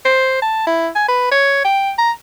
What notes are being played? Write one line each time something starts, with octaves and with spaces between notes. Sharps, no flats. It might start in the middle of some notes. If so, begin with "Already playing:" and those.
C5
A5
E4
G#5
B4
C#5
G5
A#5